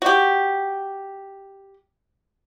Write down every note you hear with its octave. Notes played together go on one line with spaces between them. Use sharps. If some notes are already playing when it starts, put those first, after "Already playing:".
F#4 G4